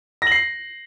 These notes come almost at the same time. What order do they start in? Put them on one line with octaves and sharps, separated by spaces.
A#6 F#7 C7